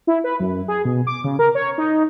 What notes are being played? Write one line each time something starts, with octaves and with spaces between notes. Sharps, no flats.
E4
B4
F#2
G#4
B2
D6
C#3
A#4
C#5
D#4